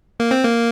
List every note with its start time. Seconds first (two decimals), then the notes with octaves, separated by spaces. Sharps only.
0.20 A#3
0.31 C4
0.43 A#3